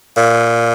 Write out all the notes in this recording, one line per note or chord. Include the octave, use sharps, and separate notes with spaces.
A#2